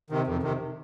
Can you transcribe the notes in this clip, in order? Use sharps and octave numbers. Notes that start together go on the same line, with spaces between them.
C3 D#3
F2
C3 D#3